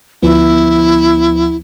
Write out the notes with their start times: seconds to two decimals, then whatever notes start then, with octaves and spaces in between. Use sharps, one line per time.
0.23 D2 F3 B3 E4